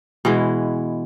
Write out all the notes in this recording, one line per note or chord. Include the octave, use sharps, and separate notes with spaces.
B2 E3 G#3